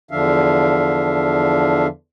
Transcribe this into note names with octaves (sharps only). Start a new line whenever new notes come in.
E2 D3 F3 D4 E5 F5